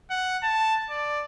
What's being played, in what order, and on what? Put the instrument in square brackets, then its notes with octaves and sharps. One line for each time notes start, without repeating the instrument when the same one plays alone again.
[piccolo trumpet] F#5
A5
D5